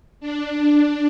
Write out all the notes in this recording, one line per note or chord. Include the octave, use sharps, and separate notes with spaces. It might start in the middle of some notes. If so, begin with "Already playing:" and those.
D4